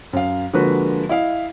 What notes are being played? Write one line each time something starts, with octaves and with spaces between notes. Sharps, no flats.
F#2 F5
D3 F3 G#3 A#3 F#4 B4
E4 D#5 F5